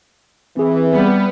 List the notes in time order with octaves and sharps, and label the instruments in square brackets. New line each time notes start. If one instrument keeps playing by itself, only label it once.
[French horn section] E3 [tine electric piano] C4 G#4
[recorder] G3 [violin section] B3